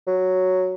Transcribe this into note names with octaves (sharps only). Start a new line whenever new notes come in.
F#3